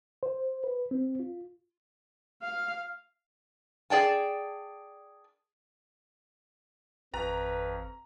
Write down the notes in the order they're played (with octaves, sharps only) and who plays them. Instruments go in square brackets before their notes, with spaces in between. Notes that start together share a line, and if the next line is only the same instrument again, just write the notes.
[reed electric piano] C5
B4
C4
F4
[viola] F5
[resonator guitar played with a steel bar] G#4 D5 G5 A5
[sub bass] G#1 [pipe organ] F2 [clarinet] B4 [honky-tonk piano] A#5